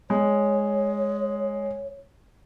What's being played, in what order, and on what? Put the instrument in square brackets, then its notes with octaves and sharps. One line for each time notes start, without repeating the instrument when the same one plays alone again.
[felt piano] G#3 [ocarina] C#5